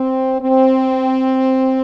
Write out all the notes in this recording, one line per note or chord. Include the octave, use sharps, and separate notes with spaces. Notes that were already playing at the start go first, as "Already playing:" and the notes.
Already playing: C4
C4